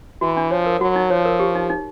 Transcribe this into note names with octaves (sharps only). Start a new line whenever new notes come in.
E3 F#4
D4
F3 C#5
A#4
F#3 F#4
D#4
F3 C#5
A#4
G4
D#4
D#4